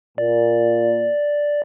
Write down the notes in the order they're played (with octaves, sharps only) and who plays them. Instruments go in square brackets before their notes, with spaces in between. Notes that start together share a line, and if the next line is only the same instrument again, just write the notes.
[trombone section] A#2 [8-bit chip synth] D5